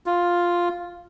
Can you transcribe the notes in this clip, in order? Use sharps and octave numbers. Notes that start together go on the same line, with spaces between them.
F4